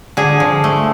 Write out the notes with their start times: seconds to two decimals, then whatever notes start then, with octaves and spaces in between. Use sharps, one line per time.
0.17 D3 G#4
0.40 F3
0.64 A3